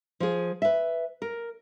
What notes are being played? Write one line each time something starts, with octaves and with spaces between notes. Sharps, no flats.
F3 G#4
B4 E5
A#4